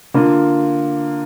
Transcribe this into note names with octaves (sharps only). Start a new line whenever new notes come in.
D3 A#3 F4